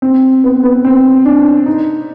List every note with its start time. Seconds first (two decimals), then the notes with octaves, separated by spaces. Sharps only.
0.02 C4
0.44 B3
0.63 B3
0.85 C4
1.25 D4
1.66 D#4